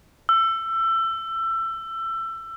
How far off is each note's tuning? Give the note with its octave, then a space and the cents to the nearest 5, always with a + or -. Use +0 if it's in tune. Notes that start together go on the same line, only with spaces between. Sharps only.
E6 +25